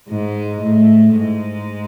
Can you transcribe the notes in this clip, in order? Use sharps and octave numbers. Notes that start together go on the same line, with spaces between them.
G#2 G#3
A2 A3
G#2 G#3